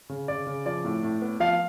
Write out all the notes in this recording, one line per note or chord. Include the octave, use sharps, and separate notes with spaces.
C#3
C#3 D5
C#3
F3 D5
A2
A2
B3
F3 F5